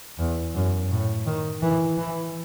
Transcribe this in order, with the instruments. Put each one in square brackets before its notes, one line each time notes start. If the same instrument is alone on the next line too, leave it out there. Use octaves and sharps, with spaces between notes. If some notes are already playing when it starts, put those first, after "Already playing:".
[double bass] E2
F#2
A2
D#3
E3
E3